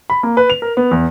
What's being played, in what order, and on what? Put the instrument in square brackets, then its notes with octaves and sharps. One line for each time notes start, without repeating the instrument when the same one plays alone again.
[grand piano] B5
A#3
B4
F7
A#4
B3
E2